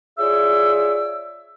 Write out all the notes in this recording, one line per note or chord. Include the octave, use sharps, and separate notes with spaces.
F4 G#4 C#5 D5 E5 E6